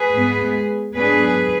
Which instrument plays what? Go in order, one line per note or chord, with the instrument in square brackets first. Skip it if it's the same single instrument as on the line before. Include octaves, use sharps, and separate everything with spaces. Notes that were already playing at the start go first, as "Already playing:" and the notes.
Already playing: [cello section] G#4 B4
G#2 G#3 B3
G#2 F#3 B3 D4 G#4 B4